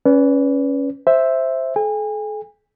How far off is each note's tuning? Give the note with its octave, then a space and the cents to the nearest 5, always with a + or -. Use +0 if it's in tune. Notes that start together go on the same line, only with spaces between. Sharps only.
C#4 +0 B4 +0 D5 -35
C5 +0 E5 +0
A4 -45 G#5 -40